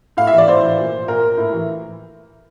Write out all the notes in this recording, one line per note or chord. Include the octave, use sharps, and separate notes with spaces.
A2 F5
E5
E3
D5
A2 C5
E3
A#2
A#2 A#4
A2
E3